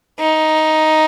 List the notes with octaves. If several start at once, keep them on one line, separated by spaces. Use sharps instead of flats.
D#4